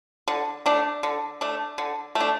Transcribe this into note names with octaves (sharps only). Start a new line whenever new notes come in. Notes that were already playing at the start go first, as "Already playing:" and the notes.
D3
A3 D4
D3
A3 D4
D3
A3
D4